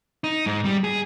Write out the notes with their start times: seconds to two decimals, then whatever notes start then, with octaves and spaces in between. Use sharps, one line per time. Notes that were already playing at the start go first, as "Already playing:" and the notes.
0.24 D#4
0.46 G#2
0.65 G3
0.84 G#4